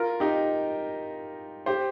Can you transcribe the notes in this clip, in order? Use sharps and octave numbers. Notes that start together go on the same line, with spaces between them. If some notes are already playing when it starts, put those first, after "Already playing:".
Already playing: F4 A#4
D#4 G4
G4 C5